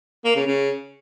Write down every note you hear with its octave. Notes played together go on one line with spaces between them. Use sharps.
A#3
C#3
C#3